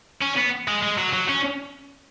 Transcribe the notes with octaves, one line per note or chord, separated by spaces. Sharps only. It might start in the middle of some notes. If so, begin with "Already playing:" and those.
C#4
B3
G#3
G#3
F#3
F#3
C#4